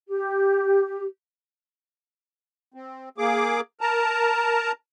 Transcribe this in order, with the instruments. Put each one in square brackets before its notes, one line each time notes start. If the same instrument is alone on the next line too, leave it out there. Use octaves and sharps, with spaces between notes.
[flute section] G4
[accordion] C4
A#3 G#4 D6
A#4 A5 A#5